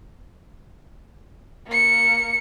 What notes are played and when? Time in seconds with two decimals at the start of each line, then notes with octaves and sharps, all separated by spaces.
1.67 A#3 C#7